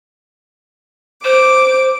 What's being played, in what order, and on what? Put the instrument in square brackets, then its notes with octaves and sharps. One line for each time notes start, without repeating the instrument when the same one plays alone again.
[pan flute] C5 [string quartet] D6